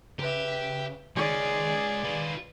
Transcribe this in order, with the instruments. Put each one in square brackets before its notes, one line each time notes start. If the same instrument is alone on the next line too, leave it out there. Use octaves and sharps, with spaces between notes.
[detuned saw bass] C#3 [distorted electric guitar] G4 [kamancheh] B4 E5
[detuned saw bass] D#3 [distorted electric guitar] G#3 C#4 [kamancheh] G#4 [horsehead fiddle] D5
[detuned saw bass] D#3 [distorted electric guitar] F4 B4